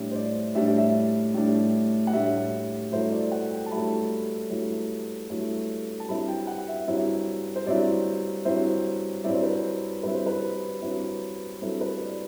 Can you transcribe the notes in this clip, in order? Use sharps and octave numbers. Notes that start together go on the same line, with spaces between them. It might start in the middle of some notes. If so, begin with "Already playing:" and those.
Already playing: A2 G3 D4 E5
C5
D5
A2 G3 D4 E5
D5
E5
A2 G3 D4
F#5
A2 G3 D4 E5
G2 F#3 A3 E4 C5
D5
F#5
G5
A5
G2 F#3 A3 E4 B5
G2 F#3 A3 E4
G2 F#3 A3 E4
A5
G2 F#3 C4 E4 B5
G5
F#5
E5
G2 F#3 C4 E4
C5
G2 F#3 C4 E4 D5
G2 F#3 C4 E4 C5
G2 F#3 C4 E4 D5
C5
B4
C5
G2 F#3 C4 E4 B4
C5
B4
G2 F#3 C4 E4
G2 F#3 C4 E4 A4
B4
D5